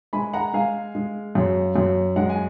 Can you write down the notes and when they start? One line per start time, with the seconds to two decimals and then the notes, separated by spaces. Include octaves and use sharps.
0.13 G#3 G#5 B5
0.33 F#5 A#5
0.53 G#3 F5 G#5
0.95 G#3
1.35 F#2
1.76 F#2
2.16 G#3 F#5
2.29 G#5